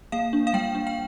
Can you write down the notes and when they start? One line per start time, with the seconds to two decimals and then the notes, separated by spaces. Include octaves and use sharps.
0.12 A#3 F5
0.33 D4
0.47 F5
0.53 G3 G5
0.75 D4
0.87 G5